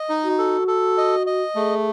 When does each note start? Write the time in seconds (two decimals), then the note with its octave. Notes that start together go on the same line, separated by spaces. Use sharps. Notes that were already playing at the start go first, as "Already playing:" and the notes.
Already playing: D#5
0.09 D#4
0.24 F#4
0.38 A4
0.68 A4
0.98 D#5
1.27 D#5
1.55 A3 G#4